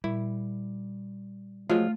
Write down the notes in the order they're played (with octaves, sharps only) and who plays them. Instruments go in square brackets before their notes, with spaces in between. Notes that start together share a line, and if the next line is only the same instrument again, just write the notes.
[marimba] A#2 [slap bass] G3 [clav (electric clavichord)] E4
[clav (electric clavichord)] F3 F#3 G#3 [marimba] A3 [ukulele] F4